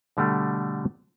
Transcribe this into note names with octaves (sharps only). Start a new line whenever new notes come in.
B2 D3 G3 A3